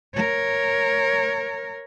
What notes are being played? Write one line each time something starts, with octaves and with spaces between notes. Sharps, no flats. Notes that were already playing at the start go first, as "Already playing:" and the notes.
A#4 C#5